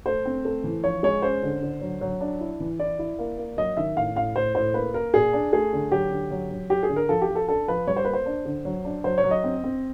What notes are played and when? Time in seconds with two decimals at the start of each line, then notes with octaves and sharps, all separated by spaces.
0.06 A3 C5
0.26 C4
0.45 A3
0.64 E3
0.84 F3 C#5
1.03 G#3 C#5
1.22 C#4 C5
1.43 D3
1.63 D3
1.81 F#3
2.01 F#3
2.21 D4
2.41 E4
2.60 E3
2.79 E4 D5
2.99 E4
3.19 A#3
3.38 A#3
3.57 F#3 D#5
3.77 D#3 E5
3.96 A2 F5
4.16 A2 F5
4.36 A2 C5
4.55 A2 C5
4.74 A#3 B4
4.94 A#3 A#4
5.14 A#2 G#4
5.33 D4
5.53 A3 G#4
5.73 D3
5.91 F#3 G4
6.11 D3
6.31 F#3
6.51 F#3
6.69 F#3 G4
6.83 G#4
6.90 D3
6.96 A#4
7.09 F3 A4
7.22 G4
7.28 F3
7.36 A4
7.48 D4 A4
7.68 F3 B4
7.87 G3 C#5
7.96 C5
8.05 A#3 B4
8.13 C5
8.26 D4
8.45 D3
8.65 F#3
8.85 D4
9.04 F#3 C5
9.18 C#5
9.24 F#3
9.31 D#5
9.44 C4
9.64 C4